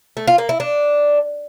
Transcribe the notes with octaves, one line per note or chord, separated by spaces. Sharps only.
A3
F4
A#3
E4
D4